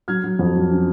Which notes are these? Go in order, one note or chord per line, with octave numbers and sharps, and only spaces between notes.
F#3 F6 G#6
F#3
F2
F#3
C#4